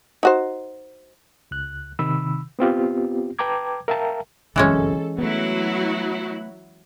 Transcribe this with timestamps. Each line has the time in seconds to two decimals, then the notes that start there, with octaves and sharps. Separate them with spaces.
0.23 D#4 F#4 C5
1.51 C#2 F#6
1.99 C3 D#3 B5 E6
2.59 B3 C4 F4 G4
3.39 B4 G5 A5 A#5 D6 G#6
3.88 A#4 E5 F5 G5 A5 A#5
4.56 G1 C2 F#2 E3 G#3 C#4 A4
5.18 F#3 A3 B3 E4 F#4